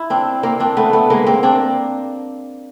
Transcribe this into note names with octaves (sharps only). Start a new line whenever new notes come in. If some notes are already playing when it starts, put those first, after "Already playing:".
Already playing: E4
C4 D4
A#3 C4
C4 D4
A3 B3
A3 B3
G#3 A#3
A#3 C4
C4 D4